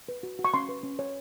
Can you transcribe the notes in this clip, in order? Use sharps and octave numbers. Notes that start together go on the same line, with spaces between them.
B4
F#4
F#4
C#6
C#4 C6
B4
C#4
C#5